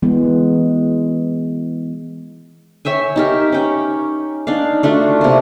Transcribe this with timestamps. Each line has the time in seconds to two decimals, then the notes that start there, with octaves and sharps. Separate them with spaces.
0.02 E3 G#3 B3
2.85 C#5 E5 G5 G#5
3.16 D#4 G4 A#4
3.52 C#4 C#5 G5
4.47 D4 D#4 D5 F5
4.83 A3 D4 F4 F#4
5.21 C3 A#3